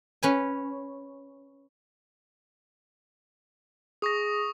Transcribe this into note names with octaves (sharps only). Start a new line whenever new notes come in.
C#4 B4 G#5
G#4 C#6 D#6 A#6